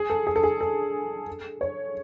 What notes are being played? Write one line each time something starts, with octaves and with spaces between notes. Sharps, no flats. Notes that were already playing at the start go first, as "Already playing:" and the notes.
Already playing: G#4
A4
G#4
A4
G#4
A4
C#5